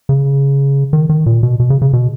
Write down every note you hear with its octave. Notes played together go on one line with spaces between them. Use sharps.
C#3
D#3
D#3
A#2
B2
B2
C#3
C#3
B2